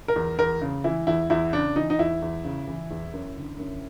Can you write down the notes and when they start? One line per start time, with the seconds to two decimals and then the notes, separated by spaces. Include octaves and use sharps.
0.08 A#4
0.16 E2
0.39 E2 A#4
0.61 C#3
0.84 E3 E4
1.07 E2 E4
1.30 E2 E4
1.53 C#3 D4
1.76 E3 D#4
1.90 D#4
1.99 E2 E4
2.22 E2
2.45 C#3
2.68 E3
2.91 E2
3.13 F#2
3.37 D3
3.59 F#2